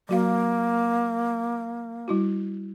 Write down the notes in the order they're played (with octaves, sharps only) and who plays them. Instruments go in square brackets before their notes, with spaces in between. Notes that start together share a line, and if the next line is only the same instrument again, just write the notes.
[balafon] F#3 F#4 F5 [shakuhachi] A#3
[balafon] G3 E4 F#4